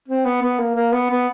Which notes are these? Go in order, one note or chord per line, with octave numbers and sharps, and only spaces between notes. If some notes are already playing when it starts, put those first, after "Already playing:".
C4
B3
B3
A#3
A#3
B3
B3